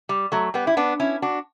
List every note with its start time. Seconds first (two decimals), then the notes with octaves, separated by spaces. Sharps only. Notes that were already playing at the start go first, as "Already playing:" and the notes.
0.09 G3
0.32 F#3 A3
0.54 G3 B3
0.67 E4
0.77 B3 D4
1.00 C#4 E4
1.22 D4 F#4